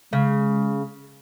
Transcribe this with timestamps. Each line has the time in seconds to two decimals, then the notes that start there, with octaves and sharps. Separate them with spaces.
0.13 C#3 G#3